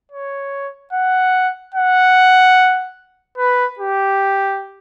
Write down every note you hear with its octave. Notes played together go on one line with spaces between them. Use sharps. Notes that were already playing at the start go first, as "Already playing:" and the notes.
C#5
F#5
F#5
B4
G4